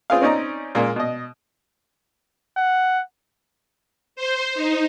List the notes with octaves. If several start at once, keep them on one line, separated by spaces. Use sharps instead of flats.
C4 F4 G#4 B4 F5
C4 C#4 D#4 D5 D#5 A#5
A#2 G#3 A#3
B2 D#5
F#5
C5
D#4